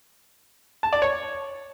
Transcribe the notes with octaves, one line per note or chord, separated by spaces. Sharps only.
A5
D5
C#5